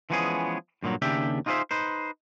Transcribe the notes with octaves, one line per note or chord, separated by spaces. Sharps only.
E3 F3 G#3 B3 C#4 G#4
G2 A#2 E3 F#3
D#2 C#3 D4 G4 E5 G5
D#4 F4 G#4 A4 C5 E5
D#4 B4 C5